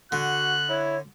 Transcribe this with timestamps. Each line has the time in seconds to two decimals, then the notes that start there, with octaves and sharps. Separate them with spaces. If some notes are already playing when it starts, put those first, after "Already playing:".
0.12 D3 F#4 F#6
0.69 E4 C#5